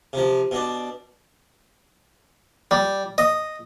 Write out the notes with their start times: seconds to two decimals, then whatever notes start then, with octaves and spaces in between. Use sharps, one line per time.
0.13 C3 F3
0.51 B2 D4
2.71 G3
3.18 D#5